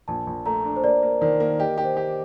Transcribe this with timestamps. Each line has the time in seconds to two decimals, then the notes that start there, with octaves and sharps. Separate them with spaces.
0.08 A#1 A5
0.27 A#1
0.46 A3 A#5
0.65 D4
0.76 C5
0.83 A#3 D5
1.02 A#3
1.21 D#3 D5
1.40 A#3
1.59 G4 D#5
1.78 G4
1.84 C5
1.97 G4